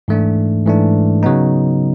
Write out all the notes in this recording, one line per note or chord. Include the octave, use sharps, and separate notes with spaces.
G#2 E3 A3 D4
G#2 E3 A3 D4
C#3 F#3 B3 D#4